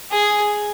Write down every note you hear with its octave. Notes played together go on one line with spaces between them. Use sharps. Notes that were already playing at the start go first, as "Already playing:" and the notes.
G#4